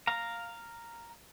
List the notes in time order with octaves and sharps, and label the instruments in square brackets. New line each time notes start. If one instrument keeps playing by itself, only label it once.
[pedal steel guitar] F5 A#5